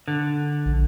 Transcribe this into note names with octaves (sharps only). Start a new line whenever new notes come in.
D3
A#1